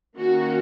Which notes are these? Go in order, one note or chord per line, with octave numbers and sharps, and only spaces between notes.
D#3 A#3 C#4 F#4